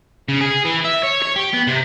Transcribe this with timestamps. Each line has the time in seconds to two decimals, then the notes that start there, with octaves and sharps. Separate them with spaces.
0.28 C#3
0.41 G#4
0.65 E3
0.84 E5
1.03 C#5
1.22 C#5
1.36 G4
1.53 B3
1.67 C3